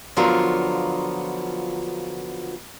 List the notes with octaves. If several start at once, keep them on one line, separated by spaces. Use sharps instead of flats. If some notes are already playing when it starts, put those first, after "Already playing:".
D3 F3 F#3 B3 F4 A#4